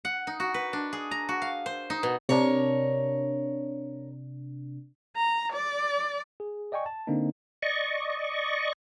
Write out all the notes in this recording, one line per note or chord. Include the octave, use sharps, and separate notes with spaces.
F#5
D#4
F#4
B4
D4
G#4
A#5
F#4
F5
C5
D#4
B2
C3 D4 A#4 C#5
A#5
D5
G#4
D5 D#5 G5 G#5 C#6
A5
D3 A#3 C4 D4 D#4
D5 D#5 C#6